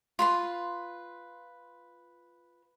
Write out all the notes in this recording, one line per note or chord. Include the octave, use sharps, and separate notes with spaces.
F4 B4 C6